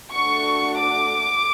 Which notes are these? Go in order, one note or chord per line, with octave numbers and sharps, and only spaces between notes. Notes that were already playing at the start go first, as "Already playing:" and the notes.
A3 D4 F#4 A4 C#6
D6